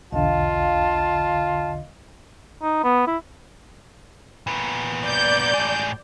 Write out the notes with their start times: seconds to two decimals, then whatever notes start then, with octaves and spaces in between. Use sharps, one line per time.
0.12 B1 E2 D3 F4 D#5 F5 A5
2.62 D#4
2.84 B3
3.07 E4
4.47 A#2 B3
5.05 D5 G6
5.54 A2 G#3